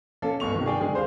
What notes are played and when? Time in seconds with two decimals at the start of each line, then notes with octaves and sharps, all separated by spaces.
0.22 A#3 C#4 A4
0.40 G1 C#2 C#6 F7
0.54 C3 D#3
0.66 G#4 D5 G5
0.81 D3 G#3 G#4
0.93 D#1 C5 F5